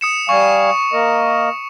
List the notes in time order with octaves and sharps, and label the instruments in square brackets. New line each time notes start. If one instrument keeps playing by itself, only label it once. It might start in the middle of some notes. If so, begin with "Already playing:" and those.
[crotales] D#6 C#7 E7
[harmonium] G3 F5 G#5 [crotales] C#6
[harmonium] A#3 A#4 D#5